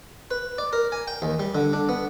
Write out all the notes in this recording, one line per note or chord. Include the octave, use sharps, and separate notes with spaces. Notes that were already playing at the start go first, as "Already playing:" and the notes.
B4
D5
A#4
G#5
G5
D#2
G3
D3
D4
B3